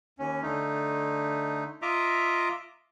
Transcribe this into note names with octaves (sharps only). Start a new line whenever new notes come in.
D#2 C#4
D3 A3 D#4
F4 D#5 E5 A#5 D6